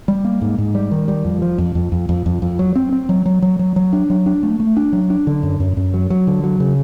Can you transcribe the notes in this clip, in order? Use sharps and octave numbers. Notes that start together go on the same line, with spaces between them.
G3
A#3
G#2
G#2
G3
D#3
G3
F2
F3
F2
F2
F2
F2
F2
F2
F#3
C4
C4
F#3
F#3
F#3
F#3
F#3
D4
F#3
D4
A3
A3
D4
F#3
D4
D3
F#2
F#2
F#2
F#3
F#3
D3
F#3
C#3